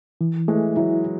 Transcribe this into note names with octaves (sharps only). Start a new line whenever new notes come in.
E3
E3 G#3 A3
F#3 E4